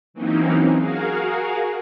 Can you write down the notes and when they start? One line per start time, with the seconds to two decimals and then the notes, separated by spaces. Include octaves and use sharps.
0.14 E3 F#3 A#3 C4 C#4 D#4
0.75 F#4 G#4 A#4 F5